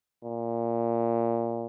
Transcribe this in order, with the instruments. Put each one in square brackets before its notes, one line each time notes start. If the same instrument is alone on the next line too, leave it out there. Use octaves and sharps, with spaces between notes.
[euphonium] A#2